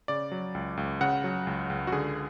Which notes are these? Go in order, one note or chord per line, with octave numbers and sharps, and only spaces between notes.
C#3 D5
F#3
C#2
C#2
C#3 F#5
F#3
C#2
C#2
F#4
D3 G#4